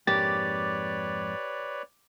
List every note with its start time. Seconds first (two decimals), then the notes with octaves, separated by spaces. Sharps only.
0.07 F2 G#2 A#3 G4 B4 C#5 D5 A6